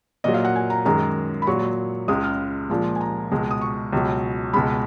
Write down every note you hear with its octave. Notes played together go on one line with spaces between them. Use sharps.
A#2 F#3 D#5
F5
F#5
G#5
A#5
F#2 D#3 G#3 A#5
B5
A#2 F#3 C#6
C#2 C#3 G#3 D#6
F6
A#2 F3 G#3
G#5
A#5
C#2 B2 G#3
D#6
C#6
C#2 B2 F#3
C#2 B2 G#3 B5